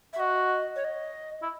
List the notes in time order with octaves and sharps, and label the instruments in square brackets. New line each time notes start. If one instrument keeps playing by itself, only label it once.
[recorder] E5
[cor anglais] F#4 [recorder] D#5
[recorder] C#5
D#5
[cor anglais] E4